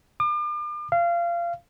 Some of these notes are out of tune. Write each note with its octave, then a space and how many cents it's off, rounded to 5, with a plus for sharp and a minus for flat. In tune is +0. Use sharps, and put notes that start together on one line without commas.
D6 +40
F5 -25